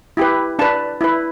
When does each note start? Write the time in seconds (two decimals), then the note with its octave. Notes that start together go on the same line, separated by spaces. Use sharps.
0.17 E4 G4 B4
0.59 D4 B4 A5
1.01 E4 B4